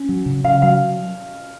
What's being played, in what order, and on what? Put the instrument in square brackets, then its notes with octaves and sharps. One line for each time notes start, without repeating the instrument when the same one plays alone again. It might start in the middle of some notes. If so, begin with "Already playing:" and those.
Already playing: [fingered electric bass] C#4
F#3
C#3
[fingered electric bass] C#3 [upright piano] F5
[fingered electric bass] F#3 [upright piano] F5